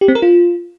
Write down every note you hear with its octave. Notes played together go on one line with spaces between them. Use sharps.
G4
C4
A#4
F4